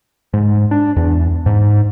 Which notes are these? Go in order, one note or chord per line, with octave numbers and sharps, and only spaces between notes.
G#2
D4
E2
G#2